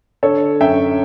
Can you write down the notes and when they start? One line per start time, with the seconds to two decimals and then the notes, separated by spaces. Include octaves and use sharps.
0.23 D3 A4 C#5
0.61 F#2 E5 G5